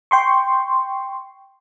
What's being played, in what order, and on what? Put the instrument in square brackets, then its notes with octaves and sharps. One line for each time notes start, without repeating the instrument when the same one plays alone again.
[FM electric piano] G5 C6 C#6